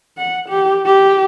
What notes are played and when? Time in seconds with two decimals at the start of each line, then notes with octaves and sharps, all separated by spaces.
0.18 F#5
0.49 G4
0.86 G4